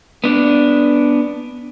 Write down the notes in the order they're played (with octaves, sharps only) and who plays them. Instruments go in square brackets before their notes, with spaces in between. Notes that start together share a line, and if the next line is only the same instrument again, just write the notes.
[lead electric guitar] B3 D4